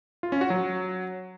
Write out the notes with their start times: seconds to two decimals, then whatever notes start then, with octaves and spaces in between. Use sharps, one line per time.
0.23 F4
0.32 C#4
0.41 F#4
0.50 F#3